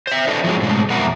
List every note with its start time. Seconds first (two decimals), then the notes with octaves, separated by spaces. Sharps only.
0.07 C5 E5
0.27 D4 A4 B4 C5 D#5 E5
0.44 F3 F#3 G#3 C4
0.61 G#2 B2 D3 G#3 A3
0.90 F2 B2 A#4 E5 F#5 A#5